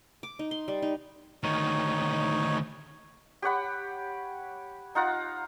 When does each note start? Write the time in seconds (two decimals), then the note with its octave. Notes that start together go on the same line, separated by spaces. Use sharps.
0.23 D6
0.39 D#4
0.51 C6
0.68 G3
0.82 D#4
1.43 D2 D#3 D#4 C#5
3.42 G4 C#5 F#5 B5
4.95 D#4 F4 F#5 A#5